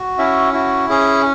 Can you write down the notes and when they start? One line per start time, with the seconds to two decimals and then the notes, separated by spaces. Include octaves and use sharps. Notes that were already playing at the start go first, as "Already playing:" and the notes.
Already playing: F#4
0.18 C#4 E4 E5
0.53 E4 F#4
0.89 C#4 G#4